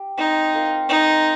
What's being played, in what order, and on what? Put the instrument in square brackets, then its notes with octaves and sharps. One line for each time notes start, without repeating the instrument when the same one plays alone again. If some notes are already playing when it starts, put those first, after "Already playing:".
Already playing: [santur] G4
[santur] C4 [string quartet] D#4
[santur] F4 A#4 F5
[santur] C4 [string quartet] D#4